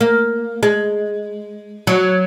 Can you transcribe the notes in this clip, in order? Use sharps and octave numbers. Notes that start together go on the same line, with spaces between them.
A#3
G#3
F#3